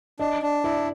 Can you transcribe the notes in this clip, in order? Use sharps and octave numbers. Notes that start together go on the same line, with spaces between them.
D4 D#5
D4
E4 D5